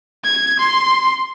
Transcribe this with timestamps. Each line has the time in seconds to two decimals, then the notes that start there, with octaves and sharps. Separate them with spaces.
0.25 G#6
0.59 C6